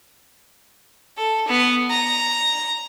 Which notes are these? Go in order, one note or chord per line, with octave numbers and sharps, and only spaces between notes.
A4
B3
A#5